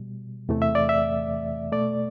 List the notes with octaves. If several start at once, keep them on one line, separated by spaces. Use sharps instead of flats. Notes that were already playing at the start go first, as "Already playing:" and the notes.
Already playing: B2 G3
E2 C3 E3 A3
E5
D5
E5
B2 A3 D5